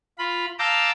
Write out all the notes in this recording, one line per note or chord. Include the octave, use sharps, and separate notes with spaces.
F4 B5
F5 A5 A#5 D6 E6 G6